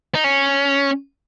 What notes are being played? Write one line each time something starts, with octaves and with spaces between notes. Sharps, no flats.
D#4
C#4